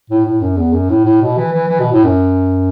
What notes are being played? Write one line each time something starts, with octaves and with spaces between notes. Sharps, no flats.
A2
A2
F#2
E2
F#2
A2
A2
B2
E3
E3
E3
B2
A2
F#2